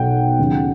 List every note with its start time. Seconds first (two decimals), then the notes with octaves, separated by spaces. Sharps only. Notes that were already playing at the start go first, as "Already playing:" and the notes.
Already playing: B1 B2 F#5 G5
0.39 D#2 C#3 F#3